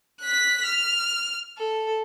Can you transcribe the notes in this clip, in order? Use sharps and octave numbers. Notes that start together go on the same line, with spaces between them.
F#6 B6
F6
A4